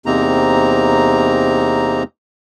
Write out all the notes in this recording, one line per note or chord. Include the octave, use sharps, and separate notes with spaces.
E2 C3 A#3 C4 D#4 A#5